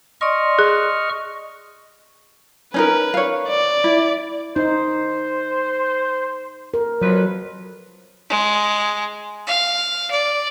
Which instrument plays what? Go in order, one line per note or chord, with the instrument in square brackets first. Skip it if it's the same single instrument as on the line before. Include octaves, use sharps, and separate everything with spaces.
[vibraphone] D5 C6 [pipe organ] D#5 C#6 F6
[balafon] G#4
[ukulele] C#4 D#4 A#4 [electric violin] B4
[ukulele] C#5 F5
[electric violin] D5
[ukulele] E4
[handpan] D#4 [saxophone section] C5
[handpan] A#4
[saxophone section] F2 B4 [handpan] F#3
[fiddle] G#3
F5
D5